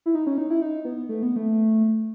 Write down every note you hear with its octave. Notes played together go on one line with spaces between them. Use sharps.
E4
D#4
C#4
D#4
E4
D#4
B3
A3
B3
A3